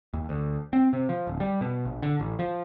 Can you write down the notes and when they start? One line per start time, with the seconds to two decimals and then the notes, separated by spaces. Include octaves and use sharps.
0.13 D#2
0.29 D2
0.73 C4
0.93 C3
1.09 F3
1.27 D1
1.40 G3
1.61 B2
1.85 A#1
2.02 D3
2.20 A1
2.39 F3